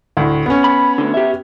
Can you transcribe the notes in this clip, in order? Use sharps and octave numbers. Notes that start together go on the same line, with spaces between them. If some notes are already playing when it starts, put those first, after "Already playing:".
D2 A2
B3 C#4
B5
D2 D3
G4 E5